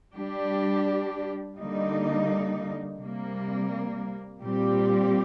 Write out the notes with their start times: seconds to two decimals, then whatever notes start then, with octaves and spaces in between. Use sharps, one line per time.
0.15 G3 D4 G4
1.57 D3 G3 A#3 D#4
2.99 C3 G3 A#3
4.41 A#2 G3 C4 G4